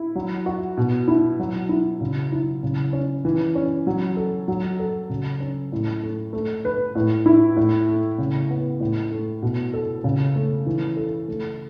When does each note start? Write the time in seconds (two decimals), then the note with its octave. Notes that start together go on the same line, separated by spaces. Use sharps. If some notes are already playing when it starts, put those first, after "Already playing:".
Already playing: E4
0.15 F#3
0.46 F#4
0.77 B2
1.08 E4
1.39 F#3
1.69 E4
2.01 C#3
2.32 E4
2.63 C#3
2.93 C#4
3.25 E3
3.55 C#4
3.87 F#3
4.17 A4
4.48 F#3
4.79 A4
5.09 C#3
5.40 C#4
5.72 A2
6.03 A3
6.33 A3
6.65 B4
6.95 A2
7.26 E4
7.57 A2
7.88 A3
8.18 C#3
8.50 B3
8.80 A2
9.12 A3
9.42 B2
9.73 A4
10.04 C#3
10.36 A3
10.66 E3
10.97 A4
11.28 A3